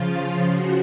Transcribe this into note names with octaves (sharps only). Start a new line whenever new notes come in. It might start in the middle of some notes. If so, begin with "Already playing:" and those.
Already playing: C#3 F3 F4
C#3 F3 F#4